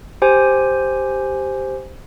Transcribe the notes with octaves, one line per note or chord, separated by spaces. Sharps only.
G4 C5 G#5